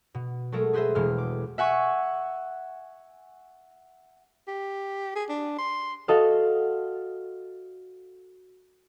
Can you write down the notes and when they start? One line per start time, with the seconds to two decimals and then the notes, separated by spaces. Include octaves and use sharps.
0.14 B2
0.52 F#3 G#3 A3 A4 A#4
0.73 G#4 B4 C5 D#5 E5
0.95 E1 B2 G#3 F6
1.18 D6
1.58 E5 F#5 G#5 C#6
4.48 G4
5.16 G#4
5.29 D4
5.59 C6
6.08 F#4 A4 D#5 F5